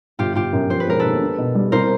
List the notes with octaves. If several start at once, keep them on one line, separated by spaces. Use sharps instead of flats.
G1 F4 G4
G1 F4 G4
F#2
F3 C5
B4
E1 A#4
D#2 A4 B4
D4
B2
G3
C2 A#4 C5